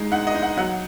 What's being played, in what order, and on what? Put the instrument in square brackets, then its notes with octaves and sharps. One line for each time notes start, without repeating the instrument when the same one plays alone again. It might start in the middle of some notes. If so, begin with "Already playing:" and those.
Already playing: [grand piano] G#3 D#4
D#4 F#5
D#5
D#4
F#5
F#3 F#5